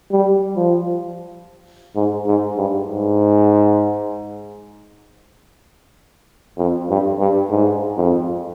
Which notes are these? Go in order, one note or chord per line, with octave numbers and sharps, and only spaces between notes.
G3
F3
G#2
G#2
G2
G#2
F2
G2
G2
G#2
F2